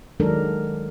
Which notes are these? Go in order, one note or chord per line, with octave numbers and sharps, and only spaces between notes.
D#3 F#3 G#3 D4 A4 A#4